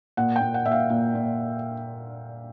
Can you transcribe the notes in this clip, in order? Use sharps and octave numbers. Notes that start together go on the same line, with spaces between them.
A#2 F#5
G5
A#2
F#5
A#2 E5
F5
A#2
A#2